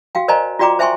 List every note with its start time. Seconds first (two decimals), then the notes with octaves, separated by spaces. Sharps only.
0.15 F#4 F5 G5
0.28 A#4 C5 D5 D#5 G#5 A#5
0.59 F4 F#4 D5 G5 A#5 D6
0.79 C5 E5 G5 G#5 C6 C#6